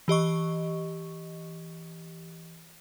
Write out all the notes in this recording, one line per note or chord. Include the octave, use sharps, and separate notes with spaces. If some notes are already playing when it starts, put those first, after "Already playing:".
E3 G4 D#5 C#6